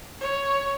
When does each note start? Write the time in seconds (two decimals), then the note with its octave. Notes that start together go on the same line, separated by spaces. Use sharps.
0.20 C#5